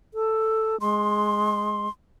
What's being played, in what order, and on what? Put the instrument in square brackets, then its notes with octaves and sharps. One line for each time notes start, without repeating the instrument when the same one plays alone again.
[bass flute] A4
[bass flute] G#3 [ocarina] C6